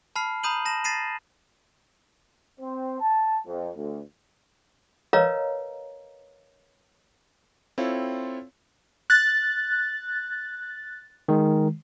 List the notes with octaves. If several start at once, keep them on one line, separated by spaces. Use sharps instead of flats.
A5 B5 F6 C7
A#5 B5 D#6 G6 D#7 F#7
A5 A#6 E7
A6 A#6 C7 D#7 E7
C4 C5
A5
F2
D2
A#4 B4 C#5 D#5 F5 A#5
C4 E4 F4 A4 C#5
F#6 A6
D#3 G#3